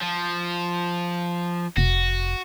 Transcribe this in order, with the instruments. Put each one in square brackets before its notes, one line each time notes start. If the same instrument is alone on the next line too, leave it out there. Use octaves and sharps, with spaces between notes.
[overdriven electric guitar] F3
[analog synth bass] F1 [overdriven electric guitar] F#4